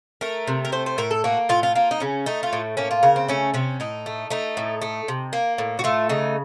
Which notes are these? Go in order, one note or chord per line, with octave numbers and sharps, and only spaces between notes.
A3 A#4
C3
A#4
A3 C5
C5
A2 A#4
A4
A#3 F#4
A2 F4
F4
A#3 F4
D#4
C#3 C#4
A3 D#4
F4
A2
A#3 C#4
F4
C#3 A#4
C4
A3 C#4
C3 C#4
A2 D#4
A3
A3 D#4
A2
A3
C3
A#3
A2
F#4
A3 F4
C#3 D#4